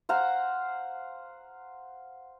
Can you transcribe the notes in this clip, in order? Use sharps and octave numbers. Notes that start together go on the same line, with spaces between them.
C5 F5 F#5 A#5